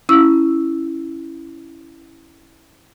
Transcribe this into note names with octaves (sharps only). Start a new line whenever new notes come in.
C#4 E4 E6